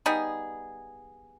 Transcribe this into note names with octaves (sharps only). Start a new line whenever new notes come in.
G3 B3 D#4 G#4